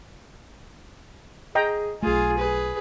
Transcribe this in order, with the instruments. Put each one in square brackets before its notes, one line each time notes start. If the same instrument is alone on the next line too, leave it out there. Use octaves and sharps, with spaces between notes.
[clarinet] G#4 [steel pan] D#5 G5 A#5
[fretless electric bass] B1 A3 [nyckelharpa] F4 G#4 [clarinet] G#5
[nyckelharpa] G#4 B4